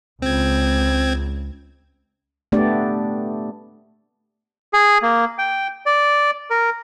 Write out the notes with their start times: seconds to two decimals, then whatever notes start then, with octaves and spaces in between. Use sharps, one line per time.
0.22 C#2 C4 G#6
2.52 A3 B3 D4 G4 D5
4.73 G#4
5.02 A#3
5.38 G5
5.86 D5
6.50 A#4